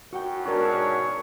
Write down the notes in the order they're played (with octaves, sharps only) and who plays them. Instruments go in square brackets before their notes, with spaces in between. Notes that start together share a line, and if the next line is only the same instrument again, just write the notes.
[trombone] F#2 [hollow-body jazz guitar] F#4 F#5 G5
[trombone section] G#2 B2 D4 [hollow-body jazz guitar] F#4 G#4 A#4 [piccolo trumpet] C#5